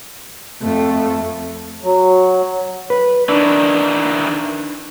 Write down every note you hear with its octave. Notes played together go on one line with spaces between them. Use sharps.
F2 A3
F#3
B4
D#3 E3 D4